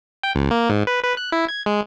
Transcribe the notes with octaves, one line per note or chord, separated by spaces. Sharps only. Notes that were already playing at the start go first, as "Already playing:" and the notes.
G5
C#2
A#3
G#2
B4
B4
F#6
E4
G#6
G#3